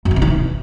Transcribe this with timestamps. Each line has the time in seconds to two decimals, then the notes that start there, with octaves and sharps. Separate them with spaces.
0.05 F#2
0.11 D#3
0.16 C#3
0.22 D#3
0.27 E3